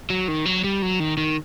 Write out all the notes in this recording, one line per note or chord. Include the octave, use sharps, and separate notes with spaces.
F#3
D#3
F#3
G3
F#3
D#3
D#3